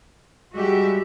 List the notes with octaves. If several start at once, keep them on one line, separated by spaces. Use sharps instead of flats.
G3 G#3 F#4 G4 E5